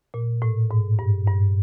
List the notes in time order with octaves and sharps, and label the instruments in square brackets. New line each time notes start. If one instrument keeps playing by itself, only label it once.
[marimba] A#2
A2
G#2
G2
G2